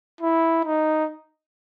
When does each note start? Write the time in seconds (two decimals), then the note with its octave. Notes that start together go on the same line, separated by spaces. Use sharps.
0.21 E4
0.65 D#4